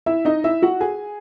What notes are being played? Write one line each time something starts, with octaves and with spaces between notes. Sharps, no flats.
E4 E5
D#4 D#5
E4 E5
F#4 F#5
G#4 G#5